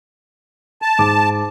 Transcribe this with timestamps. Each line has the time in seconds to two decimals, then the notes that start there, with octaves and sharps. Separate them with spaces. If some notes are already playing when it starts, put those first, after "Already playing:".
0.82 A5
0.99 G#2 D6